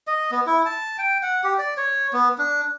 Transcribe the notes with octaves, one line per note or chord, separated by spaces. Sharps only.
D#5
B3
E4
A5
G5
F#5
G4
D5
C#5
B3
D4